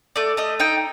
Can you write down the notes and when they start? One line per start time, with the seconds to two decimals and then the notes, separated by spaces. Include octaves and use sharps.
0.16 A3 D5
0.37 A3 D#5
0.60 D#4 G5